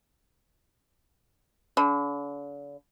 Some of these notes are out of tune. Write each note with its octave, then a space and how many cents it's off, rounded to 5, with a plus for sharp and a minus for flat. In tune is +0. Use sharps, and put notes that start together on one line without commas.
D3 -45